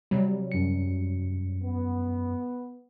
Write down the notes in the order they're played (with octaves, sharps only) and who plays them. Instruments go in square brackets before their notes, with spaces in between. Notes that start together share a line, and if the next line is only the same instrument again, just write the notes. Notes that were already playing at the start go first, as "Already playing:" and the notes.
[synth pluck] C3 F#3 G3
[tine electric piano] F#2 C#7
[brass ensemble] B3